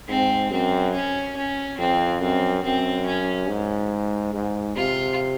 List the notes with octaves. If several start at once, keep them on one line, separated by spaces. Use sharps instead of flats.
G#2 C4
F#2 C4
C#4
C#4
F2 C4
F#2 C4
F#2 C4
C#4
G#2
G#2
C3 F4